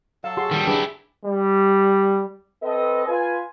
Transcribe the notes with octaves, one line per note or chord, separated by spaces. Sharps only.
F#3 A4 F5 A5
F#4 G#4 C6
D#3 G3
D4 E4 G4 G#4 B4
G3
C4 A4 B4 D#5
F4 B4 G#5